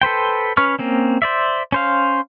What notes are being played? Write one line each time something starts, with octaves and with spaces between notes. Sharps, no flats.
A4 B4 C5 G5
C#4 B4 C#6 F6
A#3 C4 C#4
C5 D5 E5
C#4 C5 F5